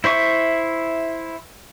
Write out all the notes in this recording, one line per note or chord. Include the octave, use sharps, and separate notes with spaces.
E4 C5 E5 C#6